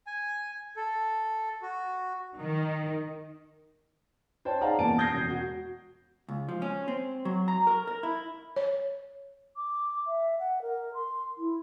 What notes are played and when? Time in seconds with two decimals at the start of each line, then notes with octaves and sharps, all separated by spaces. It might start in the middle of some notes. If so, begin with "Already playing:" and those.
0.07 G#5
0.76 A4
1.62 F#4
2.40 D#3
4.45 C5 C#5 G5 A5
4.61 D#4 G#4 D5 F5 F#5 A#5
4.78 E1 E2 A#3 A5 D7
4.98 D#6 G6 G#6 A#6 C7
5.14 E1
5.30 F#4
6.28 C#2
6.49 F3
6.62 C#4
6.88 C4
7.25 F#3
7.48 A#5
7.67 A#4
7.87 A#4
8.03 E4
8.56 C#5
9.57 D6
10.07 E5
10.39 F#5
10.62 A#4
10.94 C6
11.38 E4